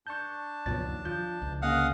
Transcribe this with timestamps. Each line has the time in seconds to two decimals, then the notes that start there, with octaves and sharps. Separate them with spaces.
0.07 D4 A5 C#6 G6
0.66 C#2 F#2 B2 F3 C#5 A6
0.83 D#2
1.05 F3 G6
1.42 C#2
1.62 D3 A#3 C#4 G#4 D#5 F5 F#5 D#6